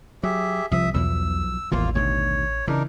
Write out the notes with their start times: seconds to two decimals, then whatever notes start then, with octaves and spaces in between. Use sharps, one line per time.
0.23 F#3 G4 G#4 E5
0.72 C2 F3 E5 D#6
0.94 B1 E2 B2 F3 E6
1.72 D#1 A1 E2 A#2 A#3 F4
1.95 D2 B2 D#3 C#5
2.68 C#3 E3 D4 D#4 A#4